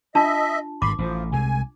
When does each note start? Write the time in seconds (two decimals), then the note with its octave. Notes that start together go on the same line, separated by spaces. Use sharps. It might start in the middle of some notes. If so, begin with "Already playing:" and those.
0.15 D4 F4 D#5 E5 A5
0.82 G#1 G2 B5 C6 D6
0.99 A1 A2 F3
1.32 C2 C3 G#3 G#5